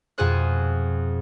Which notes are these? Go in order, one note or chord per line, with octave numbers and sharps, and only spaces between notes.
F2 B2 C4 G#4 C5 F#6